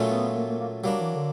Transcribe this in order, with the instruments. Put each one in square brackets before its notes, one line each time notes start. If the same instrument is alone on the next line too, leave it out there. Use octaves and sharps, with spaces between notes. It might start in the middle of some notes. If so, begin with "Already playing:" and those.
Already playing: [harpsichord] A#2 F#3 A3 C#4 F4
[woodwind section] B3
A#3
A#3
A#3
[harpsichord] F#3 A#3 D4 [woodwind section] G3
[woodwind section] E3
D3